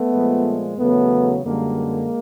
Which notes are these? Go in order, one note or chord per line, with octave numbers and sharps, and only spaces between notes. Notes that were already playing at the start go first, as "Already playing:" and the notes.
Already playing: A3 B3
A#2 F3 G#3
E2 C#3 F#3 A3 B3
F#2 D3 G3 G#3 A#3